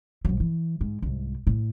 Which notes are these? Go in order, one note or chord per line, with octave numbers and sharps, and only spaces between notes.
A#1 F#3
E3
G#2
C2 G#2
A2